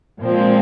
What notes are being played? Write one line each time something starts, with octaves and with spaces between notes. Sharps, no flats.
A#2 F3 G#3 C4